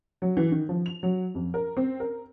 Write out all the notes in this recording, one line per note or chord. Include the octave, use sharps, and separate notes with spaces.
F#3
E3
D#3
F3
F7
F#3
F2
A#4
C4
A#4